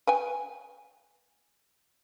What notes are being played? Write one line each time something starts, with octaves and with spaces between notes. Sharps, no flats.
B4 G5 G#5